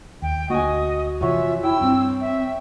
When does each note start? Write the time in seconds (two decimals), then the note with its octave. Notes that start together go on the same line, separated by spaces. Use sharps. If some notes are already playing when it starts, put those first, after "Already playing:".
0.22 D#2 G5
0.50 D2 A#3 F#4 D#5 G#5
1.21 F2 C3 E3 F4 C#5 E5 F#5
1.63 E4 G5 E6
1.81 G2 C4
2.21 E5